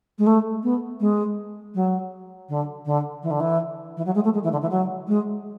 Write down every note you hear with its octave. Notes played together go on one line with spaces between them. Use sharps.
G#3
A3
B3
G#3
F#3
D3
D3
E3
D3
E3
E3
F#3
G#3
A3
G#3
E3
D3
E3
F#3
G#3